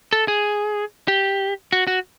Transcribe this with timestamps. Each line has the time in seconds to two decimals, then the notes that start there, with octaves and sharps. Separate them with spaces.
0.13 A4
0.28 G#4
1.08 G4
1.73 F#4
1.87 F#4